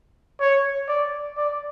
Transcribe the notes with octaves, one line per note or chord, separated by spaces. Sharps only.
C#5
D5
D5